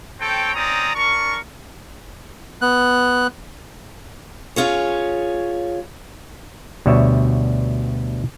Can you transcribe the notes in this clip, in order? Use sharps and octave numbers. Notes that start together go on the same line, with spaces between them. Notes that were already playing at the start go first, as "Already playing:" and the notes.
C4 A4 C#5 G5
C4 C#4 D#4 D5 A#5 D#6
D4 A#4 C#6
B3 F#6
C#4 F4 G#4 C#5
D2 B2 G3 C#5 E5